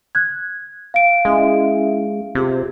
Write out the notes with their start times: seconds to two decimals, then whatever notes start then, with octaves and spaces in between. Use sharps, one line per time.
0.15 F#6 G#6
0.94 F5 D7
1.25 G#3 C#4 E4 E5
2.35 C3 F4 G4 G#4